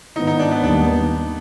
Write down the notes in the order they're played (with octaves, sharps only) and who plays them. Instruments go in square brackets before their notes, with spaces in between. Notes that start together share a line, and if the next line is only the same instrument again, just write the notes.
[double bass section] G#2 D#3 B3 [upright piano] D#4
[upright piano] D#4
D4
B3
[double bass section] D#2 D#3 G3 B3 [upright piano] D4